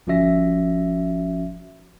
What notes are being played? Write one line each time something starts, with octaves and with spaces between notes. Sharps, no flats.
G1 F3 C#4 F#4 E5 A#6